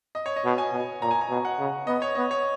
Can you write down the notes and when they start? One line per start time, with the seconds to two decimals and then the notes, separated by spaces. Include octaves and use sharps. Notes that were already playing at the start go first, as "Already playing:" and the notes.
0.15 D#5
0.26 C#5
0.36 D#5
0.45 B2
0.58 G#5
0.73 B2
1.01 A#2 A#5
1.11 G#5
1.21 A#5
1.30 B2
1.45 F#5
1.59 C#3
1.87 B3 D#5
2.02 C#5
2.15 B3 D#5
2.31 C#5